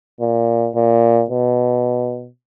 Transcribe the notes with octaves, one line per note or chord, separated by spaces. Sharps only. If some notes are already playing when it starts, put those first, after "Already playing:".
A#2
A#2
B2